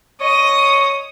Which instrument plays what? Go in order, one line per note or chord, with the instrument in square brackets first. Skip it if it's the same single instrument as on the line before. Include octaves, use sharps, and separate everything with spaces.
[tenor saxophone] C#5 [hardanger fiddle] D#5 [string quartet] D#6